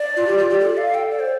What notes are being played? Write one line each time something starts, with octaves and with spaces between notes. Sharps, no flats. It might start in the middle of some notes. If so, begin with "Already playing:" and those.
Already playing: D5
F4
G4
F4
G4
A4 D5
F5
G5
D5
C5